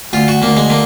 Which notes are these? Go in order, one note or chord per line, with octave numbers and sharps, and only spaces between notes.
D2 F4
F#4
D2 A#3
G#3
D3 A#3